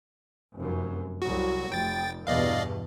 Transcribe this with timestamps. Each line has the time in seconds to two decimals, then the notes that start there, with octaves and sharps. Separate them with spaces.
0.56 F1 F#2
1.22 C2 F#3 F#4
1.72 F1 G5 A6
2.27 E2 G2 B2 D5 D#5 F5